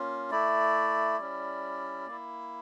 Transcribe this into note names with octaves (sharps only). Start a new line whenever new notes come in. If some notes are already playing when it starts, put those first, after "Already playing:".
Already playing: A#3 C#4 F4
A3 E4 D5
G3 C#4 E4
A#3 E4